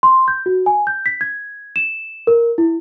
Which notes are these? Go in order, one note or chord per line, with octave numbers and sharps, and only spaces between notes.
C6
G6
F#4
G#5
G6
B6
G#6
E7
A#4
E4